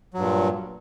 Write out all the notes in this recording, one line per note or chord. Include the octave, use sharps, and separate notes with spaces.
G2 A#2 F#3